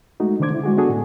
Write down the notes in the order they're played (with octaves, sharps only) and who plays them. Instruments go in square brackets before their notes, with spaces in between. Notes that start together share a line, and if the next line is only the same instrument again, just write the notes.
[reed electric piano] G#3 A3 D#4 F#4
D3 D#3 D4 C5 D6 G#6
D3 E4
G#3 F#4 G#4
B3 D4 F#4 G#4 A4
A2